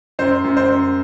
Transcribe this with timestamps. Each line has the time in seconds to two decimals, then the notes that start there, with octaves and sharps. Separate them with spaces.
0.19 F#2 C5
0.44 F#2
0.57 C5
0.69 F#2